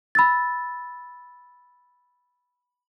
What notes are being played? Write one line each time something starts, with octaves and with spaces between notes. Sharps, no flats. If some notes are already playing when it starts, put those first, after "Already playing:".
B5 E6 A6